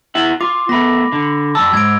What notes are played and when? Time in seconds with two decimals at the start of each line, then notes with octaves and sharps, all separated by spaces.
0.15 E4 E5 F#5
0.41 F4 D6
0.69 A3 B3 B5 A#6
1.12 D3
1.55 F#2 A5 E6
1.73 G#2 G#6 D7